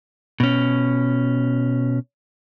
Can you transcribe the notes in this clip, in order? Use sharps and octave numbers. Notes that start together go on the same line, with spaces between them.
B2 C#4